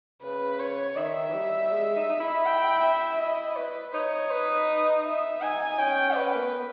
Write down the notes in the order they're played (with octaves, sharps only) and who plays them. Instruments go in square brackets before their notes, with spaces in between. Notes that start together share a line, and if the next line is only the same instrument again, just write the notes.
[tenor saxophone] C#3 [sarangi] B4
[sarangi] C#5
[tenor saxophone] D#3 [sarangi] E5
[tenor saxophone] E3
G3
G#3
D#4
D#4
E4
[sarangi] G5
E5
D#5
B4
[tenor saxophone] D#4 [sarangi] C#5
[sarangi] B4
E5
[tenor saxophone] D#4 [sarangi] G#5
[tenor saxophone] C#4 [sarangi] G5
[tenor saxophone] C#4 [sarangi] B4
[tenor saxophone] A#3
B3